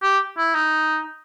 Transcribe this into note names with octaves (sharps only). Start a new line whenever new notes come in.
G4
E4
D#4